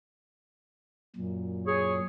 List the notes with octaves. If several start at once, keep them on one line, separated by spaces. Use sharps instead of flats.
F#2 A#2
G#4 C#5